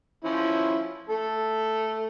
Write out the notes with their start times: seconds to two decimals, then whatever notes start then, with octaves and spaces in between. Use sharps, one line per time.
0.25 F3 C#4 E4
1.10 A3 A4